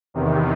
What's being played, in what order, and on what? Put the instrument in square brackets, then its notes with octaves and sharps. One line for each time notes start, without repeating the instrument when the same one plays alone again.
[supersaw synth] E2 C3 D#3